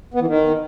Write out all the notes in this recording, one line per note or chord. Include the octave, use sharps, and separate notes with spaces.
B3
E3
D#3